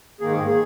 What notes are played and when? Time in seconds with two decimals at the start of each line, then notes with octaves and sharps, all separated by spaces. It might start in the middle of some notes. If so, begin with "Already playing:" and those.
0.21 G#2 D#3 A#3 G#4
0.47 G#4